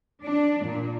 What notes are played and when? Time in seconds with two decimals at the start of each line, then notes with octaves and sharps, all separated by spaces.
0.24 D4
0.65 A#2